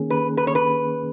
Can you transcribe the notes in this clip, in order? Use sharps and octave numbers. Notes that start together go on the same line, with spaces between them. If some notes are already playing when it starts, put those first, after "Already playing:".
Already playing: D#3 A#3 C#4 G#4
B4
B4
C#5
B4